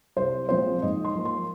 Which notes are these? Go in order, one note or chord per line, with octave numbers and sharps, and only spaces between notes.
C2 C5
A#2 F3 G#3 C4 C5
G#2 D#5
C6
F3 A#3
C6